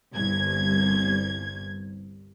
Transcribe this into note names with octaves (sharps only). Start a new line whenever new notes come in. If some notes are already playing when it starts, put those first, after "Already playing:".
G1 C2 G#6